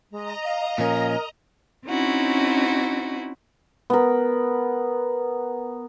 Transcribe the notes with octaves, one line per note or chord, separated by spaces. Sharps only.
G#3 D#5 A#5
F5
A#2 F3 C#4 A#4
C4 C#4 D#4 E4 F#4
B3 A#4